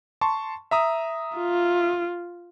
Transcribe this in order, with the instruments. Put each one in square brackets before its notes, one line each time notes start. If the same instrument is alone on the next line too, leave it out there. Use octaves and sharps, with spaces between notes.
[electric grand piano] A5 C6 C#6
E5 A#5 D#6
[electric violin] F4